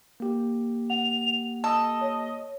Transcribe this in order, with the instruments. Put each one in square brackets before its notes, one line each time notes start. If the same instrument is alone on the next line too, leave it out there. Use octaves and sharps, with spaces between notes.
[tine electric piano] A#3 G4
[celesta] F#5 [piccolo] F7
[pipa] A4 [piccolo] D#5
[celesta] C#5